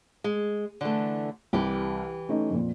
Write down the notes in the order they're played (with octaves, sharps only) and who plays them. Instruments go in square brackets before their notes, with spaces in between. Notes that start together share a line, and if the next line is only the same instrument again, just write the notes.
[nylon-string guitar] G#3
D3 E3 A3
[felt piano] C2 [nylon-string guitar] E3 G4
[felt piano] A3 C#4 D#4
F2 A#2